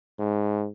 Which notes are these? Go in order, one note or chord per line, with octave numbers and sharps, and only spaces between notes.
G#2